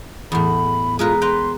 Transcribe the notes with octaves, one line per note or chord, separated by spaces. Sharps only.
E2 A2 B5
G#3 F4 A#4 B4
B4 G5 A#5 C6